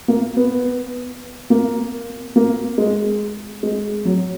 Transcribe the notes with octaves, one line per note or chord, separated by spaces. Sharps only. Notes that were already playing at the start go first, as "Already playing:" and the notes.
A#3
B3
A#3
A#3
G#3
G#3
F#3